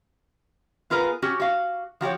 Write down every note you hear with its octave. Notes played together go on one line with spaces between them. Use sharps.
B3 F4 G#4 A#4 B4
C#4 F#4 G4
F#4 F5
F3 F#4 G4 C#5